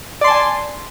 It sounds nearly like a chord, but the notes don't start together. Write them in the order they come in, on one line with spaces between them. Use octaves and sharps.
D5 C6 A5 G#5